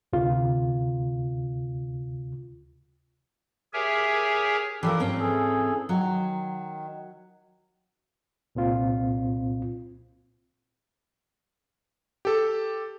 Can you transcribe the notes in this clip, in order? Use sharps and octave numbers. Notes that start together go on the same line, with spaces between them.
D2 C3 F4
G4 G#4 A#4 C#5 E5 G#5
E3 F3 D4 G4 A4 A#4
G#2 G3 C4 C#4
E3 G#4 A4
D#3 F#3
C2 A#2 C4 F4
G4 A4